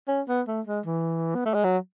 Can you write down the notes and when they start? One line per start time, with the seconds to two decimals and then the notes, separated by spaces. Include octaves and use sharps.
0.08 C#4
0.28 B3
0.48 A3
0.67 G#3
0.86 E3
1.35 B3
1.45 A3
1.54 G#3
1.64 F#3